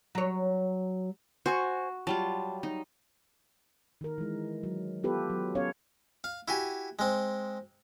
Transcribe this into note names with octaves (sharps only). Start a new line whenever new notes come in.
F#3 C#5
F#4 C5 G#5 C#6
F#3 G3 F4 A5
D#4
D#3 A#4
E3 G#3
F#3
B3 F4 G4 A4 B4
F#3
B3 C#4 A4 C#5 F5
F5
E4 F#4 G4 G#5
G#3 C4